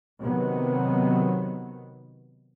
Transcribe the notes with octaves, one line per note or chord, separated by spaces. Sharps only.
C3 D#3 F#3 B3